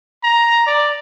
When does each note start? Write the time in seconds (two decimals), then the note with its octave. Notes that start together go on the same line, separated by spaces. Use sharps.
0.24 A#5
0.67 D5